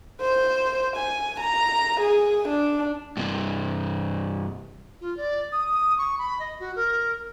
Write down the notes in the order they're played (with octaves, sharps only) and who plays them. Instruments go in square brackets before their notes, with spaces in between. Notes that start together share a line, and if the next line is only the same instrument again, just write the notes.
[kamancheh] C5
G#5
A#5
G#4
D4
[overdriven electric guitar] G2 C3
[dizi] F4
D5
D#6
C#6
B5
D#5
F#4
A#4